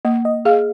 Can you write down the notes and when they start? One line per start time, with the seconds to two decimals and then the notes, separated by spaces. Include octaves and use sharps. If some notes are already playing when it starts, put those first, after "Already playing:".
0.05 A#3 D#5
0.25 D#5
0.45 G#4 F5
0.50 D#5